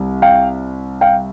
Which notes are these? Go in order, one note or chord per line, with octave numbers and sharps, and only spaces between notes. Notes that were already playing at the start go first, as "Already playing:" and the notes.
Already playing: C2
F5 G5
F5 G5